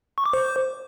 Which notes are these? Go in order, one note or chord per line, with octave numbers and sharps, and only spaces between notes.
C#6
D6
C5